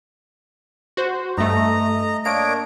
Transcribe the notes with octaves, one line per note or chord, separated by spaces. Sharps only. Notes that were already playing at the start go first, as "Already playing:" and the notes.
F#4 C5
G2 A3 D#5 A#5
A#3 D4 C#5 D#5 D7